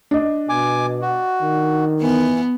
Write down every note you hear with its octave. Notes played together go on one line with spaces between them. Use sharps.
D4 D#5
B2 G#5 D6
F#4
D#3
E3 B3